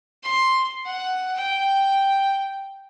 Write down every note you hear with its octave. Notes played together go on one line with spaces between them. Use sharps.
C6
F#5
G5